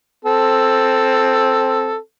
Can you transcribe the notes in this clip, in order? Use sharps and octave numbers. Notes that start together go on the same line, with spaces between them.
C4 A4